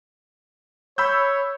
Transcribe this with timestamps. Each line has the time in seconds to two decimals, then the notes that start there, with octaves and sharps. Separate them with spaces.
0.98 C#5 B5 E6 G6